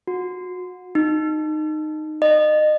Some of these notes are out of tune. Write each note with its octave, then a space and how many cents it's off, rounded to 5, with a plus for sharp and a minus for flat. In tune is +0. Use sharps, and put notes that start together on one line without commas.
F#4 -30
D#4 -15
D#5 -30